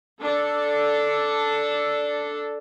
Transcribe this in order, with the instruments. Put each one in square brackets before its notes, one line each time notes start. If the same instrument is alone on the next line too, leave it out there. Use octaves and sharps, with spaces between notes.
[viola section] D4 A4